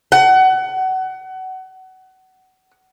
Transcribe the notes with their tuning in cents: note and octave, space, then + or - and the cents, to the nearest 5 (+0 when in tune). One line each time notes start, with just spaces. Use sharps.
F#5 +25